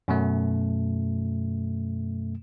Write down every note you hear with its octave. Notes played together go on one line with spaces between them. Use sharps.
F#2 B2 A3